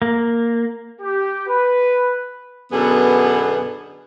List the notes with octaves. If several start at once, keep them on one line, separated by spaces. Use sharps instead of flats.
A#3
G4
B4
F#2 B2 D3 B3 G#4